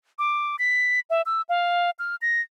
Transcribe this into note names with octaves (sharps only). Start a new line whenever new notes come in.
D6
B6
E5
E6
F5
F6
A#6